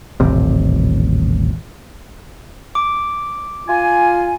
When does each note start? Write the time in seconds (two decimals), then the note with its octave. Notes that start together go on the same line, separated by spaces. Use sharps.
0.20 D#1 A1 C3
2.75 D6
3.68 F4 G#5